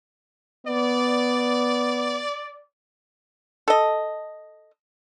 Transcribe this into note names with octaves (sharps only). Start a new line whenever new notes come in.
B3 D5
A4 D#5